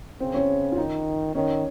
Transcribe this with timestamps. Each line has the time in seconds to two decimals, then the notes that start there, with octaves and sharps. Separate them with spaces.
0.20 C#3 C4
0.34 C#4
0.72 F4
0.77 D#3 D#4
1.35 D#3 C#4